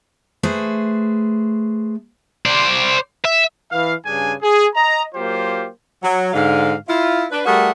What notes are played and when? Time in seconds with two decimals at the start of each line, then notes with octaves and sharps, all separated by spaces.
0.43 A3 G#4 B4 C5
2.46 C5 D5
3.25 E5
3.71 E3 B4 F5
4.06 G2 C#3 D4 G#4 G#5
4.42 G#4
4.74 D#5 A#5
5.15 F#3 A#3 F4 G4 C5
6.03 F#3
6.33 G#2 D3 F5
6.88 E4 F4
7.31 D4 B4
7.45 G3 A3 F#4 G#4 A#4 F#5